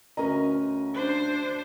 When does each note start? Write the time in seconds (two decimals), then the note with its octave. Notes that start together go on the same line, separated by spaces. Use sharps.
0.17 D2 C#4 A#4 D#5 A#5
0.95 D4 C5